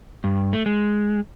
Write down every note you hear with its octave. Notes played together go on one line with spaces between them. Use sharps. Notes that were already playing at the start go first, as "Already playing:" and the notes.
G2
A3
G#3